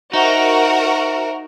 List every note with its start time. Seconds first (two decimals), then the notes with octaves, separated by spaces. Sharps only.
0.13 D#4 F#4 A#4 C5 E5 A#5